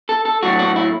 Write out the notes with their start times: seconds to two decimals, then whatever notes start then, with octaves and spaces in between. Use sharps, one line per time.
0.09 A4
0.25 A4
0.43 A2 F#3 A3 F#4
0.59 F#4
0.76 E4